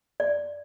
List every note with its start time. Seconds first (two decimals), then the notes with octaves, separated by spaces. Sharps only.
0.20 D5